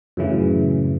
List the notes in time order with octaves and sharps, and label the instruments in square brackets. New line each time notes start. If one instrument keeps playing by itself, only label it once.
[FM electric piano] F#2 A2 C#3 E3